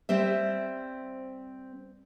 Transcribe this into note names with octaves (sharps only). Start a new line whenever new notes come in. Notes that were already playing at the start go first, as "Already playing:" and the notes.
G3 C4 C5 E5